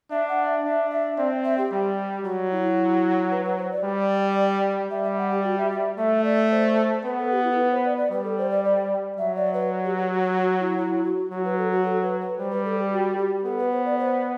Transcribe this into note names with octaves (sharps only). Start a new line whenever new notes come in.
D4 E5
F#5
E5
D4 E5
E5
C4 D5
E5
G4
G3
F#3 F#4
E4
B4
B4
C5
D5
G3
G3 E5
E5
F#5
G4
F#4
E5
E5
A3 E5
E5
D5
C5
B3 B4
A4
G4
E4
A4
B4
C5
D5
D5
G3 B4
A4
C5
D5
D5
F#3 E5
D5
B4
G4
F#4
F#4
F#4
F#4
E4
E4
F#4
F#3 F#4
B4
A4
F#4
A4
B4
B4
G3 C5
B4
A4
G4
F#4
G4
B3 A4
B4
C5
D5
C5